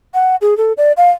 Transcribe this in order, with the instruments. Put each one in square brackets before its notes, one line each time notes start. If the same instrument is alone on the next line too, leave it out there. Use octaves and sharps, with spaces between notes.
[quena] F#5
G#4
A4
D5
F5